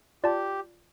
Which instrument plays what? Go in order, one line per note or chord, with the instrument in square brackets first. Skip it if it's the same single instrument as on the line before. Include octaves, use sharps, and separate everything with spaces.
[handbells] F4 D5 A5 [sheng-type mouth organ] G4